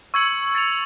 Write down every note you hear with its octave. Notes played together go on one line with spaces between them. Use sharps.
C#6 E6 G#6 C#7 F#7
A6 C#7 F7